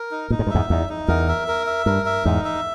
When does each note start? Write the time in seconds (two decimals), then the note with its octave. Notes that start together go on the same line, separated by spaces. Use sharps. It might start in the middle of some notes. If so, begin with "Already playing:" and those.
Already playing: A#4
0.11 D#4
0.30 A#2 D#4
0.39 G#2
0.47 G2
0.50 E2 G#2 E5
0.70 E2 D#4
0.89 D#4
1.08 E2 A#4
1.28 E5
1.48 A#4
1.67 E5
1.86 G2 A#4
2.06 E5
2.25 E2 G#2 D#4
2.45 E5